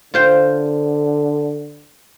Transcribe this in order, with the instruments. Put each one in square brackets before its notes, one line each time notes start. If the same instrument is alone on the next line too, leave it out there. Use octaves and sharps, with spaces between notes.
[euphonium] D3 [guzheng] F4 C5 G5